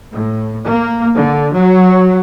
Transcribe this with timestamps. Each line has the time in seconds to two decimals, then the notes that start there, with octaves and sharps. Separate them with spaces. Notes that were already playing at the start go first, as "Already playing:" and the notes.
0.11 A2
0.68 A#3
1.18 D3
1.56 F#3